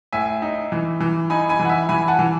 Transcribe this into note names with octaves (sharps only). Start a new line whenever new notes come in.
A2 E5 G#5
D#4
E3
E3
D#4 G#5 B5
G#5 B5
E3
F#5
E5 G#5
E3 G#5 B5
F#5 A5
E3